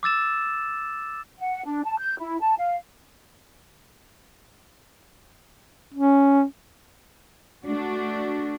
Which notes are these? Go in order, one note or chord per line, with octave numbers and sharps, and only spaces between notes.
D6 E6 A6 E7
F#5
D4
A5
G6
E4
A5
F5
C#4
A3 D4 F#4